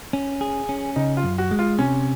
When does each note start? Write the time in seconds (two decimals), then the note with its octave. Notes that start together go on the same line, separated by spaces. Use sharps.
0.13 C#4
0.41 G#4
0.69 C#4
0.96 C#3 D#4
1.17 F4
1.23 F#2
1.38 F#4
1.51 G#3
1.59 F4
1.79 C3 C#4